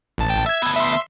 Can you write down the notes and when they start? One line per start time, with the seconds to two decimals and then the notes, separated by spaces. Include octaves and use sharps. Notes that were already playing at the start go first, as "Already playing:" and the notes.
0.18 A1 A5
0.30 G5
0.46 E5 E6 G#6
0.62 D2 B3
0.76 E5 C6